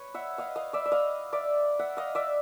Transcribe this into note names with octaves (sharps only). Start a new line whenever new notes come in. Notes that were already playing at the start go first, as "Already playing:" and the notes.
Already playing: B4 C#5
E5 F#5
D#5 F5
D#5 F5
D5 E5
E5
D#5 F5
D5 E5
E5 F#5
D#5 F5
D5 E5